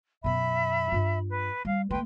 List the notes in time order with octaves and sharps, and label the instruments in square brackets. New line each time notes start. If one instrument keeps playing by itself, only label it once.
[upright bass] F#2 B2 [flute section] E5 B5
[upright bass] G2 F4
[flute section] B4
[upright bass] G3 [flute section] F5
[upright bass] A3 A#3 [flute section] B4 G5 C6